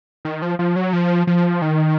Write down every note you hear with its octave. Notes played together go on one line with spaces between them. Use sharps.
D#3
F3
F3
F#3
F3
F3
D#3